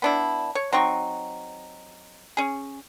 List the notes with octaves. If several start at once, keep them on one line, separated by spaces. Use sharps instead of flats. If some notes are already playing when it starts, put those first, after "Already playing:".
B3 D4 E4
C#5
F#3 C4 D#4 C#6
C#4 G#4